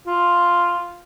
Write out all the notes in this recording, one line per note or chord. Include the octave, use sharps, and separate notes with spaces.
F4